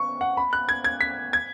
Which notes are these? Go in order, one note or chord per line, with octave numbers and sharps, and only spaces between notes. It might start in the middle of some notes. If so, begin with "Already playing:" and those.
Already playing: C#6
F#5
B5
F#6
G#6
G#6
B6
G#6